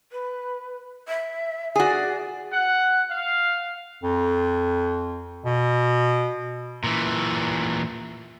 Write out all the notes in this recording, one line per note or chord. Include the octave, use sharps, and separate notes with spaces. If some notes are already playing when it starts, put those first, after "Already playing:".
B4
E5
F#4 G#4 D5
F#5
F5
F2
B2
A#2 E3